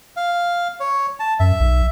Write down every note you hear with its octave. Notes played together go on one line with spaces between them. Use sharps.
F5
C#5
A5
F#2 E5
B1